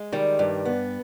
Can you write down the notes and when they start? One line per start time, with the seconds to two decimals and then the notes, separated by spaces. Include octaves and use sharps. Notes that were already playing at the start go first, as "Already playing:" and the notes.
Already playing: G#3
0.12 D#3 G3
0.39 G2
0.65 B3